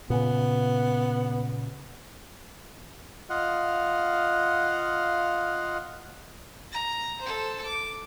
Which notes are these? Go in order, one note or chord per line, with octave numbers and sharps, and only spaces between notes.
A#2 C#3 B3
F4 D#5 F5 F#5
A#5
A4 C5
D6